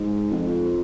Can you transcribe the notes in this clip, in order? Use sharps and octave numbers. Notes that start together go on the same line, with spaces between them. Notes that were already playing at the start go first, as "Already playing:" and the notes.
Already playing: G#2
F2